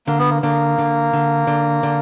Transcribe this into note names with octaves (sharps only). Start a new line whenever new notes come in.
D3 A#3
B3
A#3
D3 A#3
D3
D3
D3
D3